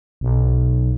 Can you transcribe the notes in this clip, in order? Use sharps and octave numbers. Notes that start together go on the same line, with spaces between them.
B1